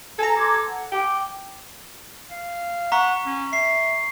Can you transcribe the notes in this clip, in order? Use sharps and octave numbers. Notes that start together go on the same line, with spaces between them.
A4 G#5 A#5
C6 D6 G#6
F#5
G5 D6
F5
F#5 A#5 C#6 B6
C#4
E5 C7